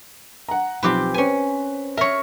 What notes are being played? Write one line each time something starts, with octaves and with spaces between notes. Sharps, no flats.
F#5 A#5
B1 F3 C4 G4 B4 D6
C#4 B4 C5 G#5
A#4 C#5 E5 C#6